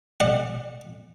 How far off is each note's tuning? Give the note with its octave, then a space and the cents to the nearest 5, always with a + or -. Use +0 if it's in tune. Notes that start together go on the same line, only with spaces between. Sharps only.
D5 +40 F#5 -20